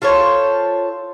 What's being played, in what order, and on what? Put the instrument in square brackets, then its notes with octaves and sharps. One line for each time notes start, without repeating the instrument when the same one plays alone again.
[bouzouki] F4 A4 C5 C#5